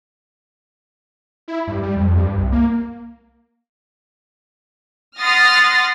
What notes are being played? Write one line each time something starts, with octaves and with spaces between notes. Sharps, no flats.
E4
G2
G3
F2
G2
C2
A#3
F#5 C6 D#6 F6 A6 A#6